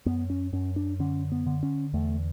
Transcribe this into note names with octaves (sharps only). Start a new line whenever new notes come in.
F#2 B3
C#4
F#2 C#4
D4
D3 C#4
B3
D3
C#4
E2 A3